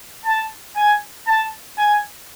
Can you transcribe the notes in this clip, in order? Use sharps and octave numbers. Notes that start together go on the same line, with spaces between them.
A5
G#5
A5
G#5